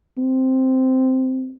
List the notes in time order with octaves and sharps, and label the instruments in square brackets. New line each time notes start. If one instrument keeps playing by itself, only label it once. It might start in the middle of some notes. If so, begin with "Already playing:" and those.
[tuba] C4